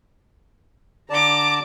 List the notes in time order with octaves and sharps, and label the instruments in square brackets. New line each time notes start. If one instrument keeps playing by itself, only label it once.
[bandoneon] D3 D5 A5 [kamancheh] A#5 D6